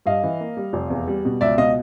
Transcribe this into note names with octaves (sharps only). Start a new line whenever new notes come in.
G2 D#5 F5
E3
A#3
G3
F1
E2
G3
B2
C#2 D5 E5
B2 D#5 F5